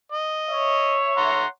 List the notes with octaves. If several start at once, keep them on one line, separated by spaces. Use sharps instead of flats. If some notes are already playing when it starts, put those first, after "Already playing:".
D#5
C#5 E5
F#5 A#5 C6